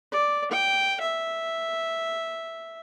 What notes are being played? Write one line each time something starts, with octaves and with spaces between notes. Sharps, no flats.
D5
G5
E5